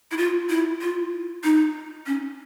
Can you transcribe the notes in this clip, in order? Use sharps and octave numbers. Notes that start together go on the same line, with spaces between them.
E4
F4
E4
F4
D#4
C#4